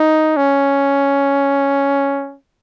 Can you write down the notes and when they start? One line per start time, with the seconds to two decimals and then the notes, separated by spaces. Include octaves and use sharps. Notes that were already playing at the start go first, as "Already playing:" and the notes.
Already playing: D#4
0.37 C#4